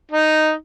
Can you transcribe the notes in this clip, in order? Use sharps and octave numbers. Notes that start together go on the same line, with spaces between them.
D#4